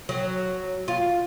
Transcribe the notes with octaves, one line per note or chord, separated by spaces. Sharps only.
F#3
F4